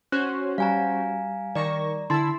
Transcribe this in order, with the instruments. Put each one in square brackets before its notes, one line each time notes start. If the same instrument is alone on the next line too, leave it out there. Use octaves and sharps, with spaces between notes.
[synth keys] C#4 F#4 C5 [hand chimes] F#6
[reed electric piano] G3 [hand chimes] F5 G#5 A#5
[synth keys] D#3 C#6 A#6 [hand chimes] D5 A#5
[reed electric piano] D3 A5 [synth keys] E4 E6 [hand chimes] C6